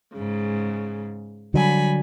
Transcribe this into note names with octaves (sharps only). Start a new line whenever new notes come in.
G#2 C#3
D3 F#3 G3 G#5 B5